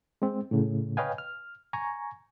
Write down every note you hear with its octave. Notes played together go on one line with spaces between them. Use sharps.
G#3 C4
A2 C#3
B4 C#5 D#5 F5 G5 G#5
F6
G#5 A#5 C#6